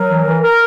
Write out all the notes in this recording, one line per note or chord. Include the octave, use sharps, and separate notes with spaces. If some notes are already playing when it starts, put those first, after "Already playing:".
Already playing: F#3 A#4
E3
E3
A#4